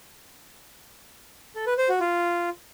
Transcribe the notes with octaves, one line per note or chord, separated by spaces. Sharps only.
A4
B4
C5
F#4
F4